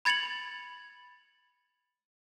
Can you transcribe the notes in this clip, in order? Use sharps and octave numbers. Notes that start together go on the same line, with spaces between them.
B5 G#6 A6 C#7 F7 F#7